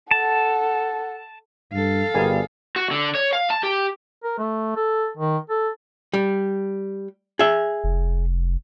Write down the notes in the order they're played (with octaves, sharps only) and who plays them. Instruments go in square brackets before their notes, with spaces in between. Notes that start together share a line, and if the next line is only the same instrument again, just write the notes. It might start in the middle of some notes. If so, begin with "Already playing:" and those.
[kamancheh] A4 F#5 [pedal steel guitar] A5
[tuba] G2 [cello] A4 F5
[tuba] G1 [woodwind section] G2 B2 D3 [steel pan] G#4 A#4 G#5
[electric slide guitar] F#4
D3
C#5
F5
A5
G4
[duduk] A#4
A3
A4
D#3
A4
[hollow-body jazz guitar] G3
G#4 E5
[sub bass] F1